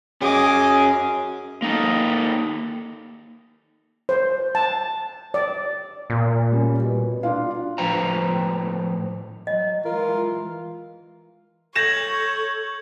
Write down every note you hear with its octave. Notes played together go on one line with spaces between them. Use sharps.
C#4 F#4 G#4 D#5 D6
A#3 D#4 A4
C5
A5
D5
A#2
G3 C#4
B2
D4 F4 F5
A2 F3 B4 C5 G5 A#5
F#3 D#5
E3 G#3 F4 A#4
A4 C#5 G6 G#6 A#6 E7 F#7